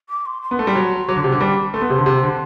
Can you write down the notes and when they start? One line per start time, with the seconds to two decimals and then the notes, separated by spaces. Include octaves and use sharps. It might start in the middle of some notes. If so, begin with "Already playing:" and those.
0.09 D6
0.26 C6
0.42 C6
0.51 B3
0.59 A3
0.67 G3
0.76 F#3
1.08 F#3 D6
1.16 D3
1.24 C3
1.32 D3
1.41 G3
1.73 A3 C6
1.81 B3
1.90 C3
1.98 D3
2.06 C3
2.23 D3